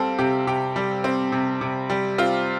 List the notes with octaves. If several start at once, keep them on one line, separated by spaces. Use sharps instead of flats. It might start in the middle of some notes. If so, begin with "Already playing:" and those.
Already playing: G3 C4 A4 F5
C3 G4
C3 G4
G3
C4
C3
C3
G3
C4 F4